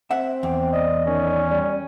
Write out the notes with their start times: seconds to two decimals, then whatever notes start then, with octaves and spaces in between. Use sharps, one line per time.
0.11 C4 E5 F#5
0.43 E2 G5
0.72 D5 D#5
1.06 D#3 C#4
1.51 G3